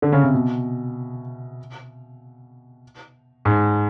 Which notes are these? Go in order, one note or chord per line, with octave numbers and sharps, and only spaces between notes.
D3
C#3
C3
B2
G#2